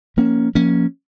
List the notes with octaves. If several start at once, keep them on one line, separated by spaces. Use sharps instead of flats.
F3 A#3 C#4
F3 A#3 C#4